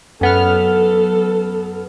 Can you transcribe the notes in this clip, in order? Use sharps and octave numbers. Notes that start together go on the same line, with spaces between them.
F#2 B3 A4 F6